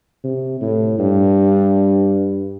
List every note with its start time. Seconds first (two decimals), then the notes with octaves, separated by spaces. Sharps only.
0.24 C3
0.61 A2
0.98 G2